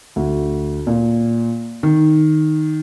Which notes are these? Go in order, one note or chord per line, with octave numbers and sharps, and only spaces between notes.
D2
A#2
D#3